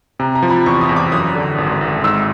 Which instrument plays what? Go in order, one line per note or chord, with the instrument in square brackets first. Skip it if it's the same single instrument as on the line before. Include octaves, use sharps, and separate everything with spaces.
[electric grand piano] C3 [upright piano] A#5
[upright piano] A#5
[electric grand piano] F3
[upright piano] B5
[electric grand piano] E2 [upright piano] C#6
[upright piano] D#6
[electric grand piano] E2
[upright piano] D6
[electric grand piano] F#2 [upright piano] D#6
[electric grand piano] D3
G#1
G#1
[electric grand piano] G#2 [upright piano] E6